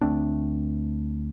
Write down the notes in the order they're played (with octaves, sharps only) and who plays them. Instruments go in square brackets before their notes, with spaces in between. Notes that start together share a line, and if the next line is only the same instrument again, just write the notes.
[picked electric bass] D2 A3 C4 D4